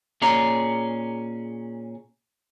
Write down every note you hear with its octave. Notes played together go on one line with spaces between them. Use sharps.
A#2 C#4 G#4 D5 A#5